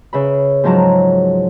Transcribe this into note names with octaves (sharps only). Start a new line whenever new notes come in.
C#3 B4 E5 B5
G#2 F3 F#3 A5 A#5